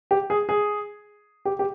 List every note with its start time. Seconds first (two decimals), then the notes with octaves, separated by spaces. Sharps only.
0.11 G4
0.30 G#4
0.49 G#4
1.45 G4
1.59 G4